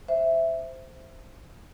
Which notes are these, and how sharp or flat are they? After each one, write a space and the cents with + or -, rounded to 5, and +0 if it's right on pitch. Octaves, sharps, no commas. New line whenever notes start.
C5 -5 E5 +0